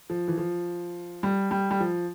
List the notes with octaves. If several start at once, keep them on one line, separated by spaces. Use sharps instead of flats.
F3
E3
F3
G3
G3
G3
F3